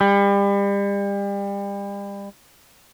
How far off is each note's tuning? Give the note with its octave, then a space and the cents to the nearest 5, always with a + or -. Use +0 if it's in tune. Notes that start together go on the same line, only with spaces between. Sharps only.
G3 +35